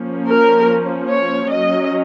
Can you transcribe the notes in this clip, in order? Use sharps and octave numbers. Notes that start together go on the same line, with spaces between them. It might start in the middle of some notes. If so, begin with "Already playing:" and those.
Already playing: F3 A#3 C#4
A#4
C#5
F#3 C#4 D#5